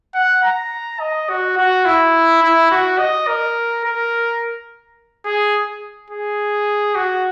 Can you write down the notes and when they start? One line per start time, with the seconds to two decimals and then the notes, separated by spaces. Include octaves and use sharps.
0.15 F#5
0.43 A#5
1.00 D#5
1.29 F#4
1.57 F#4
1.85 E4
2.43 E4
2.71 F#4
2.98 D#5
3.27 A#4
3.84 A#4
5.25 G#4
6.10 G#4
6.95 F#4